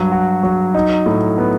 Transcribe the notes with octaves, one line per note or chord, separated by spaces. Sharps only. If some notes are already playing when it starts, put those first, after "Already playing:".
Already playing: G2 F#3
F#4
F#3
D#4
A2
B3